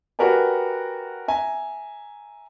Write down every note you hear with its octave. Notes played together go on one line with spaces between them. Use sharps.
F#4 G4 A#4 B4 D5 G#5
E5 G#5 A#5